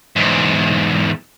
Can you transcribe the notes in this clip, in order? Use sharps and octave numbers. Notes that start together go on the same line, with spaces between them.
E2 G#2